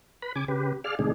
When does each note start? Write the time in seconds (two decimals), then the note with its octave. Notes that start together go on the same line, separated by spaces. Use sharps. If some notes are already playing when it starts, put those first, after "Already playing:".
0.22 B4 B5
0.36 C#3 G#5 D6
0.48 C#3 G4 B4
0.84 G#4 D5 F5 F6
0.99 A2 C3 D#3 G#3 D4 G#4